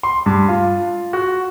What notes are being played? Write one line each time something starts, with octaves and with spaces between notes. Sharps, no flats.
C6
G2
F4
F#4